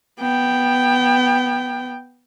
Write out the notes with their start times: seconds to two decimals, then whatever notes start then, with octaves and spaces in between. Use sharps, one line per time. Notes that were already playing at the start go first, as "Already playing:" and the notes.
0.20 B3 G5